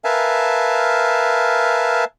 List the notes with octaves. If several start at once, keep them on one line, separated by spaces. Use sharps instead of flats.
A#4 B4 E5 F5 G#5 A5